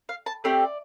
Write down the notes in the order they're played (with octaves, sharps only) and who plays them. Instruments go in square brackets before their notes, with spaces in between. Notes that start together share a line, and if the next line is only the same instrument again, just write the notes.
[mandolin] F5
A5
A3 C4 G4 D5